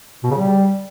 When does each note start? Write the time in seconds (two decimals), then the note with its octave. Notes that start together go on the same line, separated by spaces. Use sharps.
0.24 B2
0.31 C#3
0.38 G3